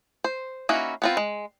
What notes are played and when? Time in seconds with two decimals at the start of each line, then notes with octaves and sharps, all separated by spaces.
0.24 C5
0.69 A#3 C#4 D#4 E4 F#4
1.02 B3 C4 F4
1.17 G#3